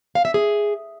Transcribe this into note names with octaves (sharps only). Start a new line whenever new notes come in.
F5
E5
G#4